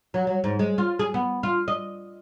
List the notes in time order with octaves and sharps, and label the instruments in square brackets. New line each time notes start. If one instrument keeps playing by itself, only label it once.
[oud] F#3
F#3
G#2
G#3
F4
G#4
B3
F4
D#5